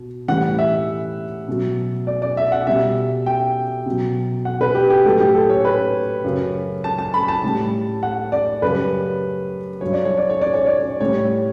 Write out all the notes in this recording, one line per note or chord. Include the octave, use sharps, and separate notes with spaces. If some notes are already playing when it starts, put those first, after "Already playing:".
Already playing: B2
A2 E3 G3 F#5
E5
B2 F#3
D5
D5
E5
F#5
B2 G3 E5
G5
B2 F#3
F#5
B4
G4
G4
A2 F#3 A4
G4
A4
C#5
B4
F#2 C#3 F#3
A5
A5
B5
A5
A2 G3
F#5
D5
F#2 C#3 G3 B4
G2 F#3 C#5
D5
C#5
D5
C#5
D5
C#5
D5
C#5
A2 G3 C#5